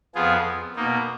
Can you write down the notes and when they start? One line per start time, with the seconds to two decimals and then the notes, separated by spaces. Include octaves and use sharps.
0.15 F2 F3 B3 F4 G#4
0.76 B2 A#3 D#4